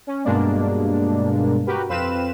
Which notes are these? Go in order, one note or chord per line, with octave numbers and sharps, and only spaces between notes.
C#4
G2 B2 G#3 A#3 D4
F#4 G4 A#4 B4
F2 C4 B4 F5 E7